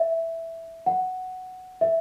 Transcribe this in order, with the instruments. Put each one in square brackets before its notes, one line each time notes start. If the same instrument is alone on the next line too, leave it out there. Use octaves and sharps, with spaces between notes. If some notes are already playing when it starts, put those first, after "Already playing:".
Already playing: [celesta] E5
F#5
E5